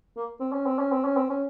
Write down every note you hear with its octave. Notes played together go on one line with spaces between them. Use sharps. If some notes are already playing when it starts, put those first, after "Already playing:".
A#3
C4
C#4
C4
C#4
C4
C#4
C4
C#4